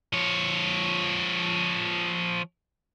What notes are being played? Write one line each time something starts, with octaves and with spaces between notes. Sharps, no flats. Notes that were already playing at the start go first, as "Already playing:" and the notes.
F3 C#5